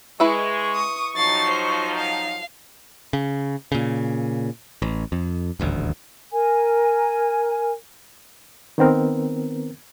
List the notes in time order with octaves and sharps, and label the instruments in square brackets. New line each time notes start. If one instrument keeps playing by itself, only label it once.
[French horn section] G#3 [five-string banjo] E4 B4 E5 [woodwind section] C#6
[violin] D#6
[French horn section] F3 F#3 D#4 [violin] A6 C7
[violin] C5
F5
[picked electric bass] C#3
A#2 C#3
A1
F2
D#1 A1 D2
[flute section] A#4 G#5
[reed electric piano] D#3 B3 C4 A#4